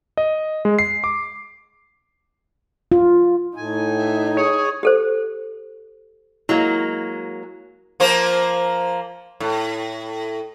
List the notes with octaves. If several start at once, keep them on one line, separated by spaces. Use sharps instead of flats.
D#5
G#3
C7
D6
F4
A2 D#4 G#5
E5
G#4 C#5
G4 A4 C5
F#3 G#3 A#3 E4
F3 A#3 C5
A2